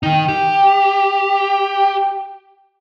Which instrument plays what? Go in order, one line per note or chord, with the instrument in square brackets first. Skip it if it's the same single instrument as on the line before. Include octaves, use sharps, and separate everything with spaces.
[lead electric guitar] D#3 D#4 [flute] G5
[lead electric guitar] G4